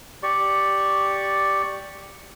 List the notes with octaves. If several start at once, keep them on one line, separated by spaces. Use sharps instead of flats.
G4 D5 C#6